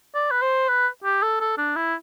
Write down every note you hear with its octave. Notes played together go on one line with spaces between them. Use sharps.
D5
B4
C5
B4
G4
A4
A4
D4
E4